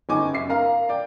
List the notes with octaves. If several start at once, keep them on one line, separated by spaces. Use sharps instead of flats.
G1 C#3 D#4 G#5 C#6 D6
F#2 E5 C7
A#4 F5 A#5
D5 G5